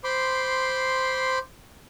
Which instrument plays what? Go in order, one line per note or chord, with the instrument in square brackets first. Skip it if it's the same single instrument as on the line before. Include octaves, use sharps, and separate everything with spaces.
[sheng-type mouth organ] C5 B5 C6 D6